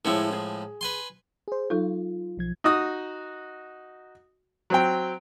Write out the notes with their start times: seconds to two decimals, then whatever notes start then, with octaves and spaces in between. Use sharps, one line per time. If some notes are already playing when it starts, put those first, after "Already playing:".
0.05 A2 F3 G#3 E4 C#5
0.33 G#4
0.81 B4 G#5 C6
1.48 G#4 C5
1.70 F#3 D#4 F4 A4
2.37 B1 F3 G#6
2.64 D#4 F#4 D#6
4.70 F#3 C4 G5